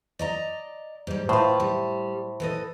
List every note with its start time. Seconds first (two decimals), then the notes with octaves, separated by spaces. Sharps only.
0.19 D5 D#5 A#5
1.07 G#2 G3
1.29 A2 F4 B4 C5
1.60 G3
2.40 E3 A4 D#5